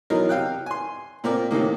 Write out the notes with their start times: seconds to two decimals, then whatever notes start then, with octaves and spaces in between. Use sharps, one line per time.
0.10 B2 E3 F#3 D#4 A#4
0.29 C3 F5 G5 F#6
0.66 G#5 C6
1.24 A#2 C4 A#4 D5
1.51 A2 C3 D#3 A#3